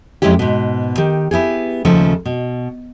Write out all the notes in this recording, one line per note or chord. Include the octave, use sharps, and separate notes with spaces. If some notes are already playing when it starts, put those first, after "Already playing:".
F2 G#3 C#4 E4 G4
G#2 B2
D#3 G4
B3 E4 G4 G#4
D#2 C#3 F3 A3 A4
B2